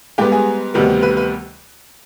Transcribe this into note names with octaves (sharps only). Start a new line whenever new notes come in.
G#2 G3 B3 G4
G#4
D2 C3 D#3 G3 B3
B4
B4